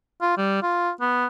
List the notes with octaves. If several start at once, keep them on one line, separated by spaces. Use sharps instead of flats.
F4
G3
F4
B3